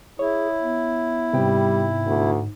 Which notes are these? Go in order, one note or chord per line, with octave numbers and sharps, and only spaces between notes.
E4 G#4 C#5
B3
G#2 C3 G3 B3 G5
D2